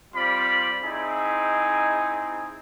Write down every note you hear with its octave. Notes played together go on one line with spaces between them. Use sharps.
G3 C4 F4 D5 B5
C4 D#4 E4 G#4